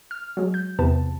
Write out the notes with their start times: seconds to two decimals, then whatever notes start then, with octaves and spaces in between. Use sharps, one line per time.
0.11 F6
0.37 F#3 G#3
0.54 G6
0.79 E2 C3 B3 B4 A5